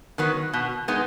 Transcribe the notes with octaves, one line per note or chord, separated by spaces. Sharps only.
D#3 F#3 B3
B2
G#3 B3 D#4